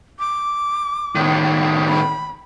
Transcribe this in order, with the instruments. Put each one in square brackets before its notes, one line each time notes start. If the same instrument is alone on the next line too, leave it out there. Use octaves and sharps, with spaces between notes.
[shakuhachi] D6
[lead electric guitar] A2 D#3
[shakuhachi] B5